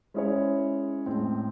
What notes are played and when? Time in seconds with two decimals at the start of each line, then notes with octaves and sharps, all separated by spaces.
0.14 G#3 C#4 E4 G#4 C#5
1.06 A2 G#3 C4